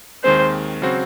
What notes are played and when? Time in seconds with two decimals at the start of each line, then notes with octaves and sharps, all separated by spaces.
0.24 D#2 D#3 G#3 C4 C5
0.82 C#3 F#3 C4 F#4 C5